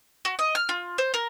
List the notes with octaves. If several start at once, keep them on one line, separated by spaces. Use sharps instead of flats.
F#4
D#5
F6
F4
C5
A#4